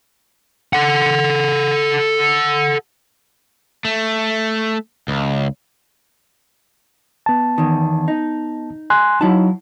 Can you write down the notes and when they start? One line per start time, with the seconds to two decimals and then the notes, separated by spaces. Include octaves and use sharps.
0.73 A4 F#5
3.85 A3
5.08 C#2
7.26 B3 A5
7.58 E2 D#3
8.08 D#4
8.90 G#5 C6 F#6
9.21 F#3 D#4 E4 A5